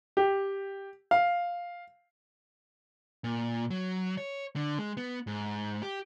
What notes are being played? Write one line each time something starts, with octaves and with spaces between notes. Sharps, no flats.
G4
F5
A#2
F#3
C#5
D3
G#3
B3
G#2
G4